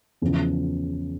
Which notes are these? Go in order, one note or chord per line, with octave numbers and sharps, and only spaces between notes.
E2 C#3 F3